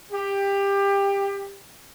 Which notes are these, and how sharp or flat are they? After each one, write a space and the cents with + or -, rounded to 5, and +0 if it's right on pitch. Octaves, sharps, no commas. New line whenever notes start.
G4 +20